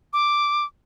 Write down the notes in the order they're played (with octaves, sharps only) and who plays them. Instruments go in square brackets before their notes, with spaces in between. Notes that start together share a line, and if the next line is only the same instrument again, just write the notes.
[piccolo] D6